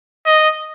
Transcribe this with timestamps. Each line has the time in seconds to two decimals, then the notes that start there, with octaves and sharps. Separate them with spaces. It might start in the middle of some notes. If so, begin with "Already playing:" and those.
0.26 D#5